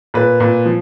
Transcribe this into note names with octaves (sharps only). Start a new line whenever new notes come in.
A#2 B4
A#2
F3